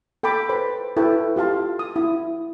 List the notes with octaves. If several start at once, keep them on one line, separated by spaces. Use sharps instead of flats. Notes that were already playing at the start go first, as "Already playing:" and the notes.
A4 G5 A5 B5 D6
B4 C5 B5
E4 A4 B4 G5 C#6
F4 G4 F5 A5 C6
D#6
E4